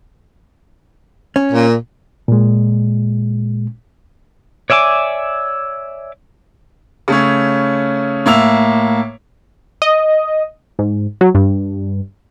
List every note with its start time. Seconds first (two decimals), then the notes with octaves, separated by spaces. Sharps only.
1.36 C#4
1.53 A#2
2.28 A#2 G#3
4.70 C#5 D5 E5 G#5 D6
7.08 C#3 A3 C#4
8.26 A2 A#3 E5 E6 F7
9.82 D#5
10.79 G#2
11.21 F#3
11.35 G2